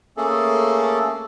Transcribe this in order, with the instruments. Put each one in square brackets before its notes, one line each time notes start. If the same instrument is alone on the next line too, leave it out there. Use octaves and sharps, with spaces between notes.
[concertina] A3 A#3 C#4 G#4 A4